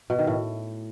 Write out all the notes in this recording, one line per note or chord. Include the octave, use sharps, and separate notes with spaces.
B2
D#3
A2